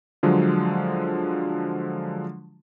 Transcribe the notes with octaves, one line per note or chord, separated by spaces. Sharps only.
D3 F3 F#3 G#3